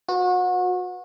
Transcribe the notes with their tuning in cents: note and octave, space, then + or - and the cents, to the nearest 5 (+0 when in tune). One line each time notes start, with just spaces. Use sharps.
F#4 -30 B4 +0